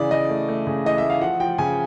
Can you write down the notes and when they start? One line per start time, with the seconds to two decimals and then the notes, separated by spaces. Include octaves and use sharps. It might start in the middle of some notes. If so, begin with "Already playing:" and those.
Already playing: C#3 E3 D5
0.11 C#3 D#5
0.29 A3
0.48 A3
0.67 C#3
0.85 E3 D#5
0.98 A3 E5
1.10 F5
1.21 F3 F#5
1.40 F3 G5
1.58 C#3 G#5